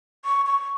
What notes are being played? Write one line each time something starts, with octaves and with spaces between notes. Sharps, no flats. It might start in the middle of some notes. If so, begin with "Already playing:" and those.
C#6
C#6